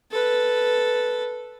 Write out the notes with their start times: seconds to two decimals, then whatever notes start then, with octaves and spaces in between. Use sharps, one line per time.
0.12 A4 B4